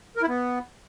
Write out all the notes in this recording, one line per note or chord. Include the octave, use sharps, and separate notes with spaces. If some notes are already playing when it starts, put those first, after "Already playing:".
A#4
E4
B3